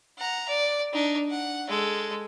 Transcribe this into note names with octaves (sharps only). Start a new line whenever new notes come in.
F#5 A#5
D5
D4 D#4
F#5
G#3 A4